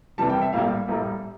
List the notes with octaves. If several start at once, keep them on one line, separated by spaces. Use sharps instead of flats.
C2 C3 E3 G3 A5
G5
E5
A#1 A2 G3 A#3 F5
A#1 A2 G3 A#3 A#5